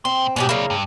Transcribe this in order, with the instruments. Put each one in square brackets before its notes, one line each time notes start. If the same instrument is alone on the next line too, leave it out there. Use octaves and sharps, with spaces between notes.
[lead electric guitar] A#2 C6 [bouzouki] C4
[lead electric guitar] G#2 [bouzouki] B2 F#3 G4
[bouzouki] C#3 A#3 [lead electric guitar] E4 D5
[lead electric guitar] G2